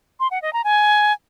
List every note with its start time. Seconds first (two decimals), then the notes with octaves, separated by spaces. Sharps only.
0.20 C6
0.31 F#5
0.42 D#5
0.53 A#5
0.64 G#5